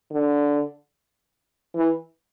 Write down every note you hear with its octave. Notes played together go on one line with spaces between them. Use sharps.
D3
E3